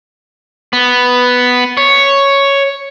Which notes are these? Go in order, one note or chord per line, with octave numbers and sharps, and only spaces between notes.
B3
C#5